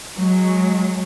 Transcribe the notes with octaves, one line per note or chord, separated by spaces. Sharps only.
F#3 G#3